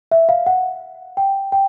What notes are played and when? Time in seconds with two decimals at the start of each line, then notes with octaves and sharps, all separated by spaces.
0.12 E5
0.29 F5
0.46 F#5
1.17 G5
1.52 G5